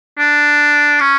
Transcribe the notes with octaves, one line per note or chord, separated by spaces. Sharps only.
D4
C#4